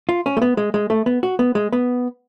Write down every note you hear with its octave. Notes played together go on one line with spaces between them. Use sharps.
F4
C#4
A3
B3
G#3
G#3
A3
B3
F#4
B3
G#3
B3